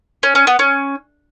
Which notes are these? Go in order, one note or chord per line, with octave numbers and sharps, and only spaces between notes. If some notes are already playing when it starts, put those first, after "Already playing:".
C#4
C#4
B3
C#4